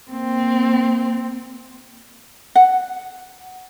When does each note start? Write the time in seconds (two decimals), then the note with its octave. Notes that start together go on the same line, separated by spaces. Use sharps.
0.11 A#3 C4
2.55 F#5